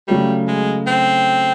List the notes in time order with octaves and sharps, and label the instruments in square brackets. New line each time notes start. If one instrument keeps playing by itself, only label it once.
[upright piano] C#3 F#3 A3 [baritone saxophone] G3
[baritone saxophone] G#3
C4